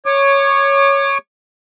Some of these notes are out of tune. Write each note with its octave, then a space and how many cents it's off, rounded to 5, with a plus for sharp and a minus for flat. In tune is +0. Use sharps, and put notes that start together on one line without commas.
C#5 +0 D6 +35